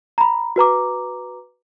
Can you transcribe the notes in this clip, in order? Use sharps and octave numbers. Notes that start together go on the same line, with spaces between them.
A#5 B5
F#4 B4 A#5 D6